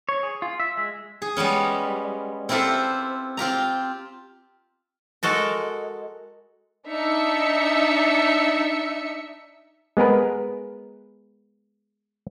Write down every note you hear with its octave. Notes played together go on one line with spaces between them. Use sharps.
C#5
G#4
F4
E5
G#3
G#4
G3 G#3 B3 C#4
C4 E4 F4 G4 A4 C5
C4 F4 G4 A#5
G#3 F#4 A4 A#4
D4 D#4 E5 E6 C#7
G#3 B3 G#4 A#4 B4